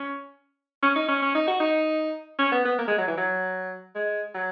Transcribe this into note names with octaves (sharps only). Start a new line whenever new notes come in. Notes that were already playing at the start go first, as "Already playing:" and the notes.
Already playing: C#4
C#4
D#4
C#4
C#4
D#4
F#4
D#4
C#4
B3
B3
A#3
G#3
F#3
E3
F#3
G#3
F#3